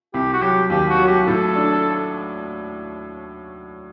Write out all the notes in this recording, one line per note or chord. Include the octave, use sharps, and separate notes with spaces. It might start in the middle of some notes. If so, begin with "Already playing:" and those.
C2 G4
F#4
F#3 G4
D#2 G4
F#4
F#3
G4
A2 A4
D4